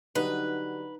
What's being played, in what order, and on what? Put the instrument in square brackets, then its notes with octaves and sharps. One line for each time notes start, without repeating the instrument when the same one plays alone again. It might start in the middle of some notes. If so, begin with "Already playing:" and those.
[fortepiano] D3 F#3 G3 [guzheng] D#4 [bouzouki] B4